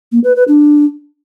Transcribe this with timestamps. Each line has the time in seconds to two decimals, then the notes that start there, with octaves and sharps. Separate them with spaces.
0.12 A#3
0.24 B4
0.36 B4
0.48 D4